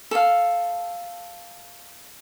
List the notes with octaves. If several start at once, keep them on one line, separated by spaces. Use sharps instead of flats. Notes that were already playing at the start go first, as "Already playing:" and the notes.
A4 F5